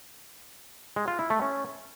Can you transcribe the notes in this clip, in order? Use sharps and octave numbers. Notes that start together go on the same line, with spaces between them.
G#3
F4
E4
A3
C#4